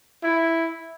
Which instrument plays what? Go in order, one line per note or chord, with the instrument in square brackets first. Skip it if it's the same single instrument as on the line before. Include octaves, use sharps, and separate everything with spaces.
[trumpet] E4